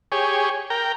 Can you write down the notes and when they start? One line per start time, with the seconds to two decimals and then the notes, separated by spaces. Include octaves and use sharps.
0.12 G4 G#4 C#5
0.70 A#4 G5